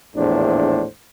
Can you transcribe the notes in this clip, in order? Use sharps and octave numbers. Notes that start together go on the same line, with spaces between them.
A#1 E2 A2 D4 C5